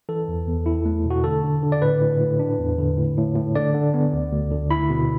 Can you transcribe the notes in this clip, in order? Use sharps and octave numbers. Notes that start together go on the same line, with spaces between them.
E3 A4
E2
E2
E4
A3
B2
F#4
D3 A4
D3
D3
D5
A2 B4
A2
A2
D4
E2
D3
A2
A2
A2
D3 D5
D3
B3
D2
D2
D3
E4 B5
B2